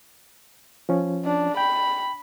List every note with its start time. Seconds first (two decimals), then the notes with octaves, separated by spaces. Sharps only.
0.89 F3 C#4
1.25 D4
1.57 G5 B5